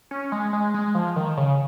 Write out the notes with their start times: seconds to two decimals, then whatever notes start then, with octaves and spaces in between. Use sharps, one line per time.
0.11 C#4
0.32 G#3
0.53 G#3
0.74 G#3
0.95 F3
1.16 D#3
1.37 C#3